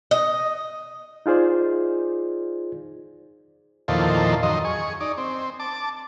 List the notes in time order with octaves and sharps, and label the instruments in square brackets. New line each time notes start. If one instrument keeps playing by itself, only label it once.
[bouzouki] D#5
[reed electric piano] D#4 F4 G#4 C5 D5
[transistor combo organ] E2 A#2 D#3 F3 A4 C5
F#2 D#3 D#5 C6
G#4 C#6
D#4 D5
C4
A5 D6